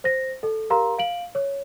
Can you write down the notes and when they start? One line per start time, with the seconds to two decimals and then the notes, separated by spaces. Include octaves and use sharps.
0.04 C5 A#6
0.43 A4
0.70 G4 A#4 F5 A#5 C6
0.98 F5 D7 F#7
1.35 C#5